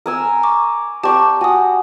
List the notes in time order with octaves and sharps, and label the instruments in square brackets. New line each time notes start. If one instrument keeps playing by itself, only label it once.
[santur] A#4 G#5 E6
[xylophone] C#6 D6
[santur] G4 D5 C6 [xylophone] A5 C#6
[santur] F#4 [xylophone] G#5 D#6